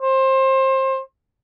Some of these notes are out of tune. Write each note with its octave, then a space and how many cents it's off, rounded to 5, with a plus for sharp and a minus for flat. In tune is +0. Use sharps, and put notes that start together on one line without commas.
C5 +25